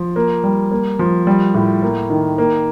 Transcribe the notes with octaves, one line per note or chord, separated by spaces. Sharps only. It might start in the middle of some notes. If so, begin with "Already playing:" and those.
Already playing: F3
A#3
G3
A#3
F3
G3
A2
A#3
D#3
A#3